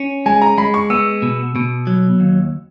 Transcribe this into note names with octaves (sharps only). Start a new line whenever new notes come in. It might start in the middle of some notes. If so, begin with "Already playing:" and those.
Already playing: C#4
G#3 G#5
A#5
G#3 B5
C#6
B3 E6
B2
B2
F#3
D#2